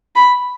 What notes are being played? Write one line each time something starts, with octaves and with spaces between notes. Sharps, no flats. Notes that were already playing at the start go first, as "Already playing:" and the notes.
B5